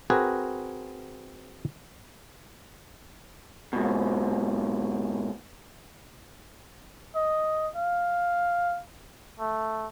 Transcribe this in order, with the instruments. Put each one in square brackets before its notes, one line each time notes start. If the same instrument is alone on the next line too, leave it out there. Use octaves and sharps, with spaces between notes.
[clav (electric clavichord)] C4 F#4 G#4 A#4 B4
[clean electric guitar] G#2 B2
[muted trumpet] D#5
F5
A3